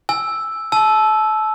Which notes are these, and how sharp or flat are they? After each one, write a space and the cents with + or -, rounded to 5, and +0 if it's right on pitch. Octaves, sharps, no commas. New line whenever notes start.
G#5 +0 E6 +0
A5 -30 E6 +0